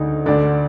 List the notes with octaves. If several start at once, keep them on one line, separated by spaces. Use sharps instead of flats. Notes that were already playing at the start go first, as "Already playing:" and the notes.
Already playing: D2 D3 D#4
D2 D3 D4 D5